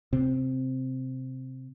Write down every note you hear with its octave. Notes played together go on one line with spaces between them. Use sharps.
C3 C4